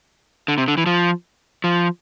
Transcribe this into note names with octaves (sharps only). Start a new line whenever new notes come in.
D3
C3
D3
E3
F3
F3